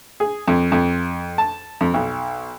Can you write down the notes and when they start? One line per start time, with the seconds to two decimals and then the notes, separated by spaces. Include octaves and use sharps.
0.20 G#4
0.48 F2
0.72 F2
1.38 A5
1.81 F2
1.94 B1